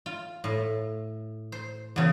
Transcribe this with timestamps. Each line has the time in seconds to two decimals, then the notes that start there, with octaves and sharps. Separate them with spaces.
0.06 F4
0.44 A2
1.52 C5
1.96 E2 C#3